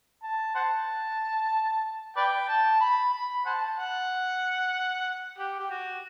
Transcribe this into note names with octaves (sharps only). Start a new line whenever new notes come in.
A5
C5 F#5 A5
B4 D5 G5
A5
B5
B5
C5 F#5 A5
F#5
G4
G4
F#4